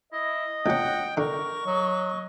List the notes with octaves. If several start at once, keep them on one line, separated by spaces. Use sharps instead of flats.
E4 D#5
C#2 C#4 F#5 G5
D3 A#4 C#6
F#3 D#5